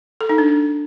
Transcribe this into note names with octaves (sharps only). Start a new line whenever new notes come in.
A4
D#4
D4